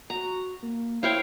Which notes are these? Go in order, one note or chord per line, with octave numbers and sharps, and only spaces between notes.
F#4 A#5
A#3
E4 C5 C#5 F5 G5